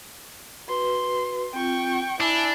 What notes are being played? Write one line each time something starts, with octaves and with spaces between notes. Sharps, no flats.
F#4 B4 C6
C4 F4 G5 C#6
D4 E4 G#5 E6